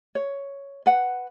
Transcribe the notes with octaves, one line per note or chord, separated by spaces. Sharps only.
C#5
B4 F#5